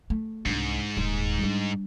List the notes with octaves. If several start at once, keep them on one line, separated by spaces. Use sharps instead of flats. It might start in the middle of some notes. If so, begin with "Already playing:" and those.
A3
C2 G#2 D4
D#1 D#2
G3 D4